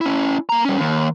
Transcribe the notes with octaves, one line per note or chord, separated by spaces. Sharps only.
C#4 E4
A#3 A#5
G3 C#4
D#2